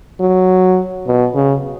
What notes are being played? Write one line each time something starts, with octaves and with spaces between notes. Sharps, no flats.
F#3
B2
C#3